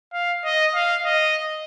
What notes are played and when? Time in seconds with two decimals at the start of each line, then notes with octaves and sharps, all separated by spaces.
0.13 F5
0.44 D#5
0.75 F5
1.05 D#5